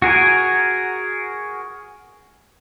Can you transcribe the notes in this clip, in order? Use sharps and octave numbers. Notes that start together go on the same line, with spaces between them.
F#4 G#4 A#4 G#5